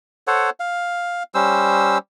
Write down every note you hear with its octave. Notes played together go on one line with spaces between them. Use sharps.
A4 C5 C#5 F#5
F5
G3 C#4 C5 E6